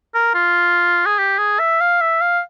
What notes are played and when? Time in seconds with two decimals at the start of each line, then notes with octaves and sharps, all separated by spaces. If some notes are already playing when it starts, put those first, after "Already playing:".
0.14 A#4
0.35 F4
1.06 G#4
1.18 G4
1.38 G#4
1.59 E5
1.81 F5
2.01 E5
2.21 F5